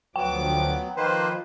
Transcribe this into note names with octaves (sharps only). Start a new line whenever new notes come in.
D2 F3 F#3 B3 G5 D6
D#3 F3 A#3 B4 C5